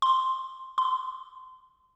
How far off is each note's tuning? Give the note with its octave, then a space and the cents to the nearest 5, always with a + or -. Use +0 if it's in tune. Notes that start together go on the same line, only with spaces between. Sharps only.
C6 +5
C6 -20